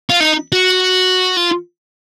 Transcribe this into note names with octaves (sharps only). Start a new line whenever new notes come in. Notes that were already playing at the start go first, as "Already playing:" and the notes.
F4
D#4
F#4
F4